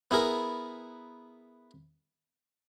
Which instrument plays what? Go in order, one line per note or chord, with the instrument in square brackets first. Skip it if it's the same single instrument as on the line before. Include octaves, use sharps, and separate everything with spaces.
[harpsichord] B3 E4 G#4 A#4